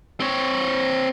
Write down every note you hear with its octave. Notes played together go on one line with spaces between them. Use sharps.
C4 C#5